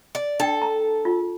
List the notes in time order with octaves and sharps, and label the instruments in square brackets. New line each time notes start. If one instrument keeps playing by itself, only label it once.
[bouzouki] D5
[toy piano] D4 G5 [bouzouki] A4
[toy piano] A#5
F4